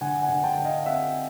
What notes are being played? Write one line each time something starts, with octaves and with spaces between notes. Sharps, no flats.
D3 F#5 G#5
F#5 G#5
D3
G5 A5
D3
D#5 F5
C4 E5 F#5